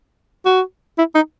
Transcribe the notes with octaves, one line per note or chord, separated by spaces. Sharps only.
F#4
E4
D#4